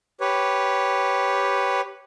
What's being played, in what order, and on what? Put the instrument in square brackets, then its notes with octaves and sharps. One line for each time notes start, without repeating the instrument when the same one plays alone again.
[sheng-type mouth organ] G4 B4 C#5